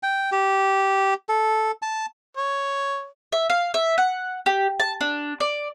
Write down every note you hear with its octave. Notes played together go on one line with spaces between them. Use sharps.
G5
G4
A4
A5
C#5
E5
F5
E5
F#5
G4
A5
D4
D5